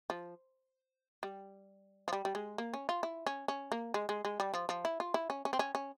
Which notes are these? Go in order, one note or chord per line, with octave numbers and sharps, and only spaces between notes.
F3
G3
F3
G3
G3
G#3
A#3
C#4
F4
E4
C#4
C#4
A#3
G#3
G#3
G#3
G3
F3
F3
E4
F4
E4
C#4
C#4
C4
C#4
C#4